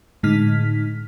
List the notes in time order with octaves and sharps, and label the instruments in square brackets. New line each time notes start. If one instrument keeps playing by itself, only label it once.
[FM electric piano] A2 D3 G#3 D#4 F6 B6